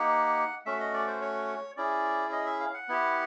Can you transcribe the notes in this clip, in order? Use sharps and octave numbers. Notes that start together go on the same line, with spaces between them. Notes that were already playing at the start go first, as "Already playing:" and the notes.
Already playing: A#3 D#4 G4 F#5
A3 C#4 F#4 E5
D#5
D5
C5
C#5
C#4 E4 G#4 D5
D#5
E5
F5
F#5
B3 E4 G4